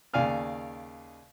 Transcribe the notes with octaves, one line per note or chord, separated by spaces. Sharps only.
D#2 C#3 D5 F5 G#5 F6